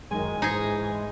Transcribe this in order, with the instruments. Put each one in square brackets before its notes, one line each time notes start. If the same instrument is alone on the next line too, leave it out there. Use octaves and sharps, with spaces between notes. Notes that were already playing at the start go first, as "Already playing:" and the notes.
[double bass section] F#2 D#3 [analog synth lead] G#3 [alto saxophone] G#5
[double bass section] G#2 E3 [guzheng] D#4 G#4